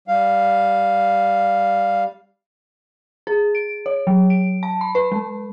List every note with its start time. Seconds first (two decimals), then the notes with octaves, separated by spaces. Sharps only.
0.08 G3 F5
3.27 G#4
3.55 D7
3.86 C#5
4.07 F#3
4.30 D7
4.63 A5
4.81 B5
4.95 B4
5.12 G#3